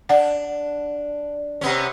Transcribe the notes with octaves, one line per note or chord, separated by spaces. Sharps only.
D4 D5 F#5
C3 B3 C#4